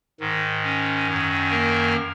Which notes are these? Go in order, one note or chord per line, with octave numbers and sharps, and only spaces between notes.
G#2 D#3
C#4
F#2
D#3
A#3 A#4